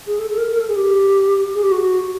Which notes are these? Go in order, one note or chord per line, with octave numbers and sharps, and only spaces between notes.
G#4
A4
A4
A#4
A#4
A4
G#4
G4
G#4
G4
F#4